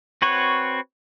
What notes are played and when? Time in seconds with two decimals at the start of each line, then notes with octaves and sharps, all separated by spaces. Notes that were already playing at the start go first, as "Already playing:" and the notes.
0.22 C4 F#4 B4 C#5